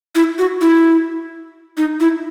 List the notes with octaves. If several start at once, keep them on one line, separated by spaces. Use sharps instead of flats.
E4
F#4
E4
D#4
E4